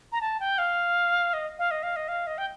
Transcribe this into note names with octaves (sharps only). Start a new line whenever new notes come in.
A#5
A5
G5
F5
D#5
F5
D#5
F5
D#5
F5
D#5
G5